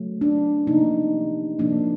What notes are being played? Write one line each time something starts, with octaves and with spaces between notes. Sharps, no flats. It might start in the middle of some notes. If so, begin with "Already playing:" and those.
Already playing: C#3 F#3 A3
D4
C3 F3 A#3 D#4
C3 F3 A#3 D4